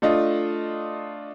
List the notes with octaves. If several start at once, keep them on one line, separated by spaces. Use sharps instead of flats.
A3 D4 F4 D#5